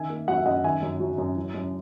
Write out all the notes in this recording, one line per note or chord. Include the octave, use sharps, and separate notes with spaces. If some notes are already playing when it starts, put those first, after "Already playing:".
Already playing: D#3 E5 G#5
A#3
F#3 F#5
E5
F#2 D#5 F#5
D#3 E5 G#5
F#2
F#3
F#2
E3
F#2